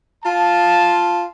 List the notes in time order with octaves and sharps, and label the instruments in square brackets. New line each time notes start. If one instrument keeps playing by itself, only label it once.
[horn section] F4 A5